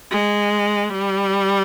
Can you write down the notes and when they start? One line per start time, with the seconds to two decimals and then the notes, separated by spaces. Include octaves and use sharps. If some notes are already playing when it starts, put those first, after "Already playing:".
0.11 G#3
0.90 G3